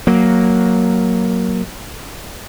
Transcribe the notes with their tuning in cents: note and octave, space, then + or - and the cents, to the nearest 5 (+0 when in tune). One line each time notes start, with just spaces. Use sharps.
F#3 +0 A#3 +0